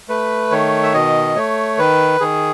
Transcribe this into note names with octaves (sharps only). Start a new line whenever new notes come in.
A3 B4
D#3 C#5
E5
B2 D#5
A3 C#5
D#3 B4
D#3 G#4